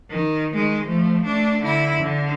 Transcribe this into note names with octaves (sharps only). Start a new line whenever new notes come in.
D#3
D#3 G#3
F3 A3
A3 D4
D3 E4
D3